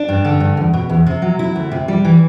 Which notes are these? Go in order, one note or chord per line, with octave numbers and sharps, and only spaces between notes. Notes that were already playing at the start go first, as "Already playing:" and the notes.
Already playing: D4
G2
D3
G2
E2
B2
E2
C3
F#3
E4
D2
C3
G3
E3